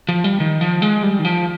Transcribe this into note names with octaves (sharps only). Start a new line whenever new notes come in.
F3
G3
D#3
F3
G#3
G3
D#3
F3